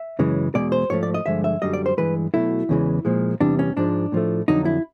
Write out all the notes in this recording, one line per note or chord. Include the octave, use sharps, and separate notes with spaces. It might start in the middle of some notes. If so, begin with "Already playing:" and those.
Already playing: E5
F#2 C#3 E3 G#3
E2 B2 G#3 D5
C5
G#2 F3 A3 C#5
D5
D#5
G2 D3 F3 G#3 E5
E5
F#2 D3 G3 D#5
D5
C5
G2 E3 G#3 B4
B2 F#3 A3 E4
E2 C#3 E3 G#3
A#2 F3 G#3
E2 C3 E3 G3 D4
C#4
G#2 F3 G#3 D4
A2 F3 A3
F2 D3 F#3 D#4
E4